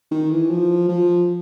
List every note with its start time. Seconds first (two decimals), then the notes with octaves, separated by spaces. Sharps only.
0.11 D#3
0.31 E3
0.50 F3
0.88 F3